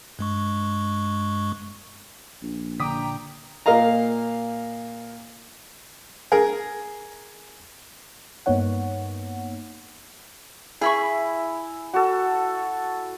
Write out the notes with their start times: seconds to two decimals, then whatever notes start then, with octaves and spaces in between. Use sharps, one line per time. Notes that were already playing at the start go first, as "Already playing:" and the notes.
0.19 G2 G#3 C#6
2.42 A#1
2.80 A#2 D3 G5 A#5 D6 D#6 B6
3.66 A#2 A#3 D#5 F5 A#5
6.32 G#4 A#4
8.46 G2 A#3 B3 D#4 C#5 F#5
10.81 E4 G#4 B5 C#6
11.94 F#4 A4